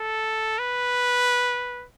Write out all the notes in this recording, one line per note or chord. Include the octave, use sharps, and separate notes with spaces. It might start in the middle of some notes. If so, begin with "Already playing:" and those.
Already playing: A4
B4